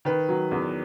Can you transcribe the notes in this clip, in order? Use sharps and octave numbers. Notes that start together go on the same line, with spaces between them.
D#3 B4
F#3
E2